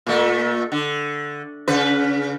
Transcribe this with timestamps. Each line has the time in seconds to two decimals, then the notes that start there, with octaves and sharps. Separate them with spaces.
0.07 A#2 A3
0.72 D3
1.68 C#3 B4